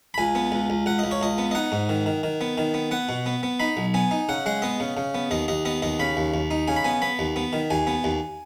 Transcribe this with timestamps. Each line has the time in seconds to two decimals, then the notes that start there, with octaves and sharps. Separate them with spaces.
0.14 B5
0.18 C#2 G#5
0.35 B3
0.52 C#2
0.70 C#2
0.86 C#2 F#5
0.99 C#2 D#5
1.11 C#5
1.21 C#2 D#5
1.38 B3
1.51 D#5
1.55 D#4 F#5
1.72 G#2
1.89 D#3
2.06 D#3
2.23 D#3
2.41 B3
2.58 D#3
2.74 B3
2.91 B3 F#5
3.09 B2
3.26 B3
3.43 B3
3.60 D#4 B5
3.77 B1
3.94 B3 G#5
4.11 D#4
4.29 C#3 F#5
4.46 G#3 F#5
4.62 B3 D#5
4.80 C#3
4.97 C#3
5.15 B3
5.31 D#2 D#5
5.48 D#2 D#5
5.65 B3 D#5
5.82 D#2 D#5
6.00 C#3 B5
6.17 D#2
6.34 D#2
6.51 D#4
6.68 C#3 G#5
6.76 B5
6.84 B3 G#5
7.02 B3 B5
7.19 D#2
7.36 B3
7.53 D#3
7.70 D#2 G#5
7.87 B3
8.04 D#2